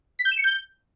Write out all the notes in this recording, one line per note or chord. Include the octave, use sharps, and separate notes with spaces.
B6
G6
E7
C#7
G6